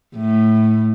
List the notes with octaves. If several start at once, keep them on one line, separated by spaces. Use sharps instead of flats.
A2